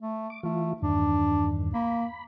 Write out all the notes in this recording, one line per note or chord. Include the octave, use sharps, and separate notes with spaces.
A3
D6
E3 A3 F4
E2 G2 D#3 D4
A#3 B5